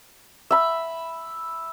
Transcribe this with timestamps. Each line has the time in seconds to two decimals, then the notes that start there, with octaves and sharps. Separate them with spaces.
0.51 E5 B5